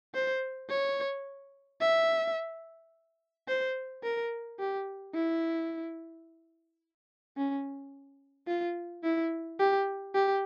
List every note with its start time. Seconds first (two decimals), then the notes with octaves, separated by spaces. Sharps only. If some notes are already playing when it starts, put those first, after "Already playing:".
0.14 C5
0.70 C#5
1.81 E5
3.48 C5
4.04 A#4
4.59 G4
5.14 E4
7.37 C#4
8.47 F4
9.03 E4
9.59 G4
10.15 G4